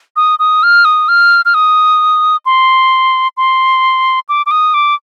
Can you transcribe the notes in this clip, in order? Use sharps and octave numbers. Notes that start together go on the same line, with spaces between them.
D#6
D#6
F6
D#6
F6
F6
D#6
C6
C6
D6
D6
D#6
D6